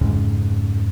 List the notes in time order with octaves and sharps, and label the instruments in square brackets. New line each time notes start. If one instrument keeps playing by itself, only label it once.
[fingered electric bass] F2 G#2 C#3